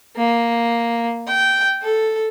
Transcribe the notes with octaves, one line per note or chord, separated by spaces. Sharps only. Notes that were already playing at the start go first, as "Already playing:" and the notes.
A#3
G5
A4